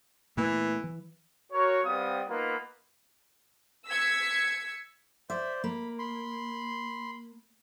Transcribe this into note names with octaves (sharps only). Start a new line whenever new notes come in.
A#2 E3 A3 B3
E3
F#4 A#4 C#5
G3 B3 C4 F5 D#6
A#3 B3 D#4 F4 B4
E6 G#6 B6 C#7
C5 D5 E5
A#3 B5
B5 C6